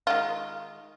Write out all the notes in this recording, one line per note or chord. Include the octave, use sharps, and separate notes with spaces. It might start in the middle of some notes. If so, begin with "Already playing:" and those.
D#3 G#3 F4